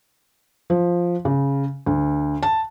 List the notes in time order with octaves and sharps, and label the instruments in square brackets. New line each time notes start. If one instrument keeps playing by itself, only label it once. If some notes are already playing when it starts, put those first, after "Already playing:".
[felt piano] F3
C#3
D2
A5